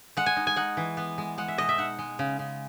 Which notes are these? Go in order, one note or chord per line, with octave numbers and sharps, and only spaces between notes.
G#3 F#5
G#5
D#4
G#5
D#4 F#5
E3
B3
G#3
G#3 F#5
E5
B2 D#5
E5
D#4 F#5
G#3
C#3
C#3